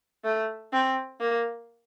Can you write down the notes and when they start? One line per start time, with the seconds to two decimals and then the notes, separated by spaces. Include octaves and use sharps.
0.24 A3
0.73 C4
1.20 A#3